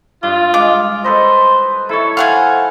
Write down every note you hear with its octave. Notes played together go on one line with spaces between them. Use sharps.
G2 F4
G#3 D6
A4 B4 C5 D#5
E4 A4 C#5
C5 F5 F#5 G#5